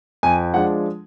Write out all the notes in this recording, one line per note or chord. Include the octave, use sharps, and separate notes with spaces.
F2 G#5
F3 G#3 D4 F#5